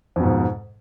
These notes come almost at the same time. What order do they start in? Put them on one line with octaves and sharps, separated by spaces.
F2 B2 G#2